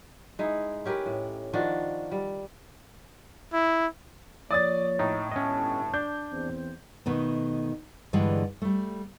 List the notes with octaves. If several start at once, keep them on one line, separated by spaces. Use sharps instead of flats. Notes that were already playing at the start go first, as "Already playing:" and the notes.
G#3 D#4 E4
C#4 G4 A#4 B4
A2
D#3 F3 D4 F#4
G3
E4
F3 A#3 C#5 D5 D#6 A6
A2 D#4
G1 C#4 D#5 A5
D4 G6
E2 C4
B2 D#3 A3 B3
G2 D3 E3 G#3 G4
G3 A3